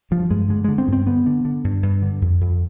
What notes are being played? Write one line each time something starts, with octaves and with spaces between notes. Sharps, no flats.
G2 F3
G2 G#3
D3 G#3
D3 G#3
C4
G2
C4
D3 B3
D3
D3
G2
G2
D3
F2
F2